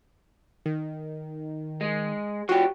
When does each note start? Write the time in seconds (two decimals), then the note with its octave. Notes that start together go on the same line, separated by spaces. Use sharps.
0.66 D#3
1.81 G#3
2.49 F3 F#4 G4